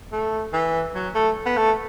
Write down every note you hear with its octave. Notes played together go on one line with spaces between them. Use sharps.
A3
E3
F#3
A3
B3
A3